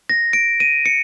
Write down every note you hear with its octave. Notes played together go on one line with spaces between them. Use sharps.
A#6
D7
D#7
C#7